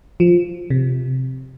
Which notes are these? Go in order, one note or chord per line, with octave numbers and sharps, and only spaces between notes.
F3
C3